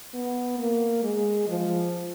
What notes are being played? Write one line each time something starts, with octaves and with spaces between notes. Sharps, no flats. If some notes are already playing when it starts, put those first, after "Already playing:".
B3
A#3
G#3
F3